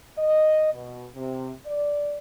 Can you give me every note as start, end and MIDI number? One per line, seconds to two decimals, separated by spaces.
0.18 0.73 75
0.73 1.06 47
1.15 1.51 48
1.66 2.18 74